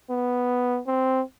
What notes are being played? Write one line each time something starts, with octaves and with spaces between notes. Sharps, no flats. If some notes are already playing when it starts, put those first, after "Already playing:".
B3
C4